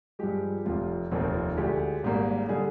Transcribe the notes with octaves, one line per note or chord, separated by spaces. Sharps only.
G2 F3 G#3 G4
F1 F2 C3 F4
F1 D#2 D#3 C4
F4
D2 D3 G#3 G4
G#1 G#2 G3 A#3
D3 G3 G#4